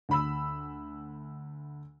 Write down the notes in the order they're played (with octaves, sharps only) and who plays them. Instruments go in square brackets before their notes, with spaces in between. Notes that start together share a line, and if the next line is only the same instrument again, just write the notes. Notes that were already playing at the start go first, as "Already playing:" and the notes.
[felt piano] D2 B5 E6